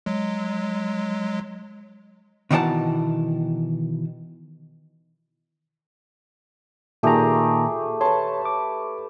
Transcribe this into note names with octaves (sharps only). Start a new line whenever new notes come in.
F#3 G#3
B2 D#3 E3 D5 F#5 A5
A#2 D#3 A3 G4 G#4 A#5
B4 C#5 A5 C6
D6